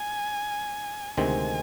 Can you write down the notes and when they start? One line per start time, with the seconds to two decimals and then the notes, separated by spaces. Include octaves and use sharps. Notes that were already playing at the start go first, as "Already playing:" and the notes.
Already playing: G#5
1.17 D2 C3 D#3 G#3 C4 G#5